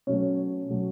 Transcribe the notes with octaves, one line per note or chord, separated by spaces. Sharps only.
B2 F#3 A3 C#4 C#5
B2 F#3 A3